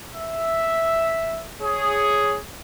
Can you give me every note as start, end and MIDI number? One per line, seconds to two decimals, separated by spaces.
0.15 1.43 76
1.61 2.36 68
1.61 2.36 73